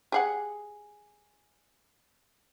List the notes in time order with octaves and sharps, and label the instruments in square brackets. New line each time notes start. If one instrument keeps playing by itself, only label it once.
[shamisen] G4 G#4 F#5